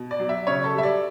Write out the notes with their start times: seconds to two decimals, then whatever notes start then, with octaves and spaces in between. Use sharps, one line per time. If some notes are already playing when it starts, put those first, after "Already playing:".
Already playing: B2
0.11 D5
0.20 F#3
0.29 E5
0.47 C#3 C#5
0.64 A4
0.73 G3 E5
0.83 D5